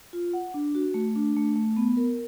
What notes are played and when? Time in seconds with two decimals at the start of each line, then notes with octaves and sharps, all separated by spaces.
0.13 F4
0.33 F#5
0.54 D4
0.75 F#4
0.94 A3
1.15 D4
1.36 A3
1.56 A3
1.77 B3
1.97 A#4